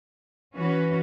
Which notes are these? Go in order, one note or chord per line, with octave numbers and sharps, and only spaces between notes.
E3 C#4 F#4 B4